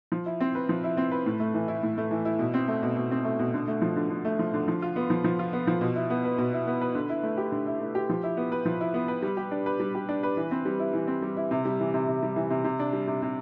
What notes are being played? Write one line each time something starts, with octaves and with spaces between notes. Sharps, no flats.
F3
E4
C4
B4
F3
E4
C4
B4
A2
A3
E3
E4
A2
A3
E3
E4
B2
C4
A3
B2
B2
C4
A3
B2
D3
A3
F3
D3
D3
A3
F3
D3
F3
F4
B3
F3
F3
F4
B3
F3
B2
E4
B3
B4
B2
E4
B3
B4
D3
E4
A3
G4
D3
E4
A3
G4
F3
E4
B3
B4
F3
E4
B3
B4
G3
G4
D4
B4
G3
G4
D4
B4
E3
C4
G3
E4
E3
C4
G3
E4
C3
G3
E3
C3
C3
G3
E3
C3
C3
D4
G3
C3
C3